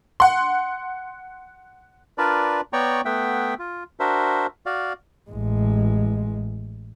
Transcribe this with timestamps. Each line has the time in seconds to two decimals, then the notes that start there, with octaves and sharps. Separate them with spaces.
0.20 F#5 C6
2.18 D4 F4 A#4 B4 D5
2.73 B3 C#5 D5 G5 A#5 C#6
3.05 A3 B3 E5 F#5 G5
3.59 F4
4.00 D4 F#4 A#4 C5 E5
4.66 F#4 D5 F5
5.31 A1 G#3